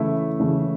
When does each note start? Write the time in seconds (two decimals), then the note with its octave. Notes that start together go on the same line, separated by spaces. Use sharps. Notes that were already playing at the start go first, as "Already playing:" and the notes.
Already playing: C#3 E3 A3 E4 E5
0.39 C#3 E3 A3